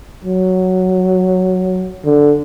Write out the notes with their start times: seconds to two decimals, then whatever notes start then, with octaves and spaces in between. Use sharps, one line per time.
0.25 F#3
2.06 D3